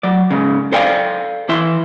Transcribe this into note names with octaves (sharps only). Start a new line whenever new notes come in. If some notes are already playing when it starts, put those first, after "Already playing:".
F#3 D5
G#2 C#3
A4 C5 D5 F5 G5 G#5
E3 E4 E5 C6